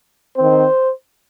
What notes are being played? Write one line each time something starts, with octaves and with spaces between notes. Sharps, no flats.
D#3 C4 C5